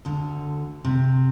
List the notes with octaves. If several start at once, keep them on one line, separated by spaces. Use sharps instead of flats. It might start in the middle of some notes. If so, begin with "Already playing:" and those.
D2 D3
C3